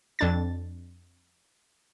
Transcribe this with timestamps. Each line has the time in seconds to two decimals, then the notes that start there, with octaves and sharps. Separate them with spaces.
0.19 F2 D4 A6